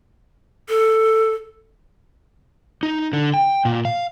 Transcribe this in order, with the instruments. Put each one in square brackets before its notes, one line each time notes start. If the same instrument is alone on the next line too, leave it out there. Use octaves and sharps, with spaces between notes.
[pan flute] A4
[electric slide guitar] D#4
D3
G5
A#2
F5